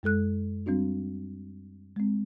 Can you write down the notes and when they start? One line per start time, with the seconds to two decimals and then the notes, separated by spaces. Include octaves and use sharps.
0.03 F#2 G#3 A4 F#6
0.66 G3 C4 D4 F#4
1.96 G#3 C4